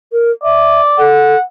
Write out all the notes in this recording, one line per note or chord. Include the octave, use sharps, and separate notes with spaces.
A#4
D5 E5
A4 F#5